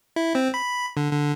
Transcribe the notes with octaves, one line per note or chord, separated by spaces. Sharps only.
E4
C4
B5
D3
D3